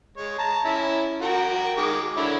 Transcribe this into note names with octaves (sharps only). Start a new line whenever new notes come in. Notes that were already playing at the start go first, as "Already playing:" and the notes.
G#3 C#5
A5 A#5
C#4 E4 E5
F#4 A#4 G5
D#3 G#3 D6
D3 E4 C#5